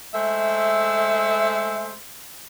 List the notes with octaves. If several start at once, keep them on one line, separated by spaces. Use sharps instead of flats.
G#3 A3 C5 E5